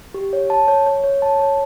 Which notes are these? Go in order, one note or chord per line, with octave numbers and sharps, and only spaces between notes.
G4
C#5
A5
C#5
C#5
C#5
A5
C#5